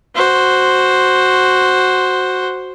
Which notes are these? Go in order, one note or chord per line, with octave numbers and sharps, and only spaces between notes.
F#4 C5